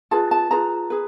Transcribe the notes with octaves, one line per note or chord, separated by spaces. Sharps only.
F4 G#4 B4 A5
A5
F4 G#4 B4 A#5
G#4 B4